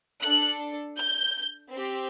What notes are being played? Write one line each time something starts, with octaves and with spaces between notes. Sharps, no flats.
D4 A4 F#6
G6
C4 G4